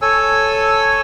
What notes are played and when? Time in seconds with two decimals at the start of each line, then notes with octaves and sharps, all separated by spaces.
0.02 A4 C#5 G#5 E6